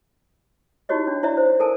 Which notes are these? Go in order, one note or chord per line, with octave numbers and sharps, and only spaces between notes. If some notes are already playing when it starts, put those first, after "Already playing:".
D#4 E4 F#4 G4 C#5 D#5
D4
E4 C#5 D5 E5 A#5
C5
A4 A#4 G#5 A5